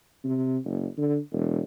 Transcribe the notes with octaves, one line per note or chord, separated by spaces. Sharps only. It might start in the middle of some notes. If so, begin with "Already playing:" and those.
C3
F#1
D3
E1